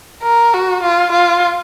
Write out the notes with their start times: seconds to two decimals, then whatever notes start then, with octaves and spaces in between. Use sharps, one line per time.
0.23 A#4
0.54 F#4
0.83 F4
1.12 F4